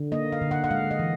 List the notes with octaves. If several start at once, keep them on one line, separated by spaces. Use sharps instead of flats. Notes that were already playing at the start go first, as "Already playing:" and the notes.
Already playing: D3
A#3 D#5
F5
D3
F#5
F#5
G#3 F5
D#5
E3